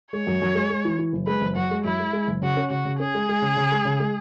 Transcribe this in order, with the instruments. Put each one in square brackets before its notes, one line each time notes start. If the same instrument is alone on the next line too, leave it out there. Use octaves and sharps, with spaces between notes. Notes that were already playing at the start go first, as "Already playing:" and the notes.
[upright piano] G#3 [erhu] C#5
[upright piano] F#2
F#2
G#3
G#3
E3
E3
F#1
[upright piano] G#3 [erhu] B4
[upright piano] F#1
[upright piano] F#2 [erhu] F#4
[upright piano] G#3
[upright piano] F#2 [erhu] E4
[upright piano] G#3
G#3
F#1
[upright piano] C#3 [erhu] F#4
[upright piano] C#4
[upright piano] C#3 [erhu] F#4
[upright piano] C#3
[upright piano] C#4 [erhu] G#4
[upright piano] G#3
G#3
C#3
C#3
G#3
C#3
G#3